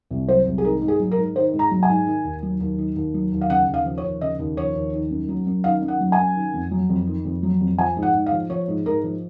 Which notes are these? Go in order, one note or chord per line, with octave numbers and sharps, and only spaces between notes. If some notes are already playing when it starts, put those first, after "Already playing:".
C2
F#3 C5
C2
G#4
D#3 A#4
G#2
G#4
F#3
A#4
G#2
D#3 C5
G#2
A#5
F#3
G#5
G#2
D#3
D#2
F#3
D#2
D#3
D#2
F#3
D#2
F5
C#3 F#5
D#2
F5
F3
C#5
D#2
C#3 D#5
D#2
F3 C#5
D#2
D#3
F#2
F#3
F#2
D#3 F5
F#2
F#5
F#3
G#5
F#2
D#3
F2
F#3
F2
D#3
F2
F#3
F2
F3 G#5
G#2
F#5
G#2
F5
F3
F3 C#5
G#2
G#2 A#4
F3